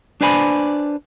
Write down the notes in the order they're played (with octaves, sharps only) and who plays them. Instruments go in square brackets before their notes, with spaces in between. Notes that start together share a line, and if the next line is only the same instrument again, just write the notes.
[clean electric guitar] D4 B4 C5 D5 G#5 B5